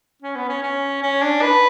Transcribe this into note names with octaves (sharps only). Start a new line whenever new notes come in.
C#4
B3
C#4
C#4
C#4
D4
B4